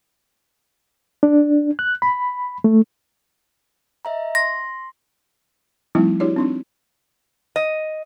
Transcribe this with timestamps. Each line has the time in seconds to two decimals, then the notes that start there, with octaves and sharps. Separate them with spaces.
1.23 D4
1.79 F#6
2.02 B5
2.64 A3
4.05 D#5 E5 A#5
4.35 C6 A#6
5.95 F3 G3 A3 C4 D#4 E4
6.20 D4 E4 F#4 G4 C#5 D5
6.36 C4 D4 D#4
7.56 D#5